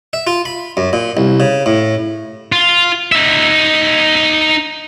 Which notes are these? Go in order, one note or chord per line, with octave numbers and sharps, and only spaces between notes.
E5
F4
B5
F#2
A#2
C2
C#3
A2
F4
D#4 E5